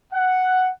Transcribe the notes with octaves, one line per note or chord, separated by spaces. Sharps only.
F#5